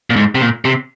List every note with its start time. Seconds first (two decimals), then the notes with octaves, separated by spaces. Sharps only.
0.10 A#2
0.16 G#2
0.35 C3
0.41 A#2
0.65 C3